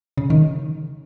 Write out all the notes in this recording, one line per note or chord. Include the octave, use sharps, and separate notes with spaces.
C#3
D#3